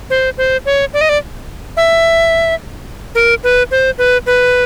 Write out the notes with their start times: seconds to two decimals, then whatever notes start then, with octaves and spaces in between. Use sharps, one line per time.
0.10 C5
0.38 C5
0.66 C#5
0.94 D5
1.01 D#5
1.09 D5
1.77 E5
3.15 A#4
3.44 B4
3.71 C5
3.98 B4
4.26 B4